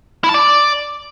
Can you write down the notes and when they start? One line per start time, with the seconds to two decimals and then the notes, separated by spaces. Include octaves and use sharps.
0.24 E4
0.29 A5
0.34 D5